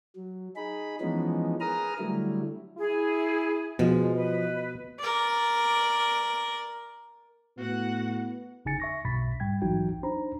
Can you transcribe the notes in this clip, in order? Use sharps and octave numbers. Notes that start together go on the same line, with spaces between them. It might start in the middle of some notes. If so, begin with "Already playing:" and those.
F#3
D#4 G#4 B5
E3 F3 G#3 B3 C#4 D#4
G#4 A#4 B4 A#5 D#6 F6
D3 F#3 G3 A3 E4
E4 G#4
B2 F3 G#3
B4 D#5
A#4 D5
A2 B3 F#4 F#5
G1 C#3 D#4 G#5 A6 C#7
E5 C#6 A#6
B1 G2 B2 B5 A6 B6
G#2 G3 G5 G#6
A#1 E3 F#3 D#4 F#4 G5
D4 D#4 C5 A#5 B5